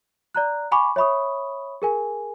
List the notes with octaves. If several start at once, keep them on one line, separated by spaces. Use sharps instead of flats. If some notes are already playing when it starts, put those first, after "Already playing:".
D5 A#5 F#6
F#5 G#5 B5 C#6 D6
C#5 E5 B5 C#6 D#6
G#4 A#4 G#5